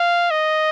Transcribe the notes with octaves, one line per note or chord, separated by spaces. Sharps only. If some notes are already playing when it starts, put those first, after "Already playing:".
Already playing: F5
D#5